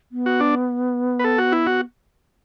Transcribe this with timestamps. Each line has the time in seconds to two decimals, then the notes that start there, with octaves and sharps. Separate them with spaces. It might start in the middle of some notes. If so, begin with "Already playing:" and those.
0.12 B3
0.26 F#4
0.40 D4
1.19 B4
1.24 A4
1.38 F#4
1.52 E4
1.66 F#4